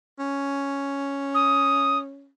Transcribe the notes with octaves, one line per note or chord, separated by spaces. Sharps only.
C#4
D#6